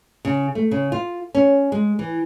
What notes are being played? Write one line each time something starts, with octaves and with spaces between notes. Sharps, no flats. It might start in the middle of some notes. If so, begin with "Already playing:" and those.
C#3
A3
C#3
F4
C#4
G#3
E3